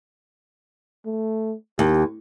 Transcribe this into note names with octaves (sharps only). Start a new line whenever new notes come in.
A3
D#2 G4